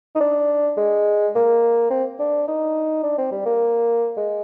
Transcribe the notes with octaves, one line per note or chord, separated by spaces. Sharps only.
D#4
D4
G#3
A#3
C4
D4
D#4
D4
C4
G3
A#3
G#3